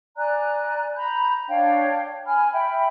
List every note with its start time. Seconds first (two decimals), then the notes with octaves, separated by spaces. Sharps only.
0.17 D5 G#5 A#5 F#6
0.97 A#5 B5 G6
1.48 D4 C#5 F5 G5
2.26 G#5 B5 F6
2.52 E5 G5 B5